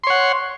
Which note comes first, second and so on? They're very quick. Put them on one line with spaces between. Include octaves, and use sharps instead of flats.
C6 C#5 F#5